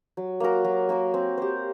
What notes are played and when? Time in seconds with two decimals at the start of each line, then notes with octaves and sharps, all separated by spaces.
0.17 F#3
0.40 A#3 F#4 A#4
0.64 F#3
0.89 A#3 F#4 A#4
1.14 C4
1.37 G4 C5